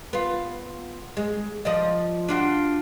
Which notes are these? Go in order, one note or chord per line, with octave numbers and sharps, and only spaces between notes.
B3 F4
G#3
F3 D5 D#5
D4 F4 F#4